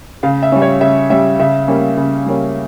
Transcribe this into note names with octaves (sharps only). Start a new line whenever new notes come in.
C#3 F5
E5
G3 C#4
C#5
C#3 E5
G3 C#4 E5
C#3 E5
G3 A#3 C#4
C#3
G3 A#3 C#4